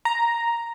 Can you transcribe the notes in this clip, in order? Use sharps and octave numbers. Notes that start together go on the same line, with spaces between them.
A#5